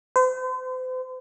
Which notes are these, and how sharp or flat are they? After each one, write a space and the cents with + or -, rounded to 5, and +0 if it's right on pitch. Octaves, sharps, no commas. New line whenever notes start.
C5 -40